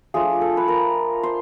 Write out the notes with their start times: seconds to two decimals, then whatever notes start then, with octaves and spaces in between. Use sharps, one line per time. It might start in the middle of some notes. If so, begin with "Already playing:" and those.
0.14 F3 A3 D4 F4 G#4
0.41 A4
0.57 B4
0.68 A#4
1.23 C5